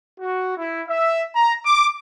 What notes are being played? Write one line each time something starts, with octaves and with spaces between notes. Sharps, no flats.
F#4
E4
E5
A#5
D6